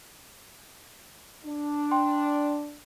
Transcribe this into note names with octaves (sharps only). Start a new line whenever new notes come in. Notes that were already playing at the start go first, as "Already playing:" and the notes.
D4
G5 C6